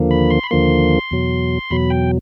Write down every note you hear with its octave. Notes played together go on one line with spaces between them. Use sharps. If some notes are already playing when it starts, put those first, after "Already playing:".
Already playing: D#2 D3 F3 A#3
B5
C6
B5
D#2 D3 F3 A#3 C6
E2 B2 F#3
E2 B2 F#3 B5
G5